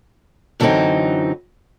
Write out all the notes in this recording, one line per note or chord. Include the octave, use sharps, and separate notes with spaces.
F#2 D3 E3 F#3 C4 D#4